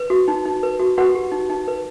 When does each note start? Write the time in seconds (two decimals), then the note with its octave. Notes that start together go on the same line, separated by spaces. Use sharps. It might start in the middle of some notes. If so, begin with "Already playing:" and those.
Already playing: B4
0.10 F#4
0.28 D#4
0.46 D#4
0.63 B4
0.80 F#4
0.98 F#4 B4 F#5
1.15 G4
1.32 D#4
1.50 D#4
1.68 B4